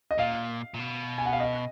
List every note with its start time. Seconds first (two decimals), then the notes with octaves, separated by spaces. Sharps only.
0.11 D#5
0.18 A#2 F5
0.74 A#2
0.79 B2
1.18 G#5
1.25 F#5
1.33 F5
1.40 D#5